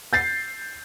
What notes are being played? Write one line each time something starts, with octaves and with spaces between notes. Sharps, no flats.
G6 A6 C7